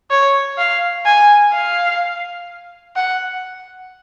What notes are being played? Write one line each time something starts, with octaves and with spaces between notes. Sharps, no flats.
C#5
F5
G#5
F5
F#5